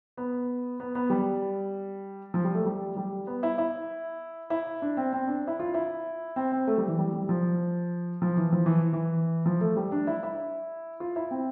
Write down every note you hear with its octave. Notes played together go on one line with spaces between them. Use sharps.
B3
B3
B3
G3
F3
G3
A3
G3
G3
B3
E4
E4
E4
D4
C4
C4
D4
E4
F4
E4
C4
C4
A3
G3
E3
G3
G3
F3
F3
E3
F3
E3
E3
F3
A3
G3
D4
E4
E4
F4
E4
C4